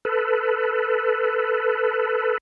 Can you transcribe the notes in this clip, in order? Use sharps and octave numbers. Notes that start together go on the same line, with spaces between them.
A4 B4